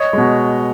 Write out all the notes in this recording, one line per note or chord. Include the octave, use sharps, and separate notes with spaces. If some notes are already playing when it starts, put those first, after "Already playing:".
Already playing: C#5 D#5
B2 G#3